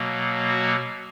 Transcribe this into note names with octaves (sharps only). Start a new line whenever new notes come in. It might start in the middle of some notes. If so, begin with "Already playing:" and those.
Already playing: B2 F#3 A#3
F#4